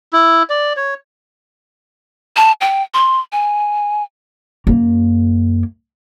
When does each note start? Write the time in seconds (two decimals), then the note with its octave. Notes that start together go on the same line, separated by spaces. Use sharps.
0.13 E4
0.50 D5
0.77 C#5
2.36 A5
2.61 G5
2.94 C6
3.32 G#5
4.67 F#2 A#3